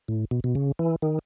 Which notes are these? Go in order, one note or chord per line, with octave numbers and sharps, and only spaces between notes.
A2
B2
B2
C#3
E3
D#3